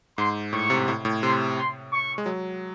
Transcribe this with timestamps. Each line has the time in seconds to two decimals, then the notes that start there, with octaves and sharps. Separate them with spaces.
0.18 G#2 C6
0.53 A2 C#6
0.70 C3
0.88 A2
1.05 A2
1.22 C3 C6
1.57 C6
1.92 C#6
2.18 G#3
2.26 F#3